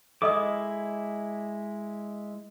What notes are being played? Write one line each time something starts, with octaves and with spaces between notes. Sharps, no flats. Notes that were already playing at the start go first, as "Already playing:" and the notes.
G#3 E4 A4 D#5 D6 D#6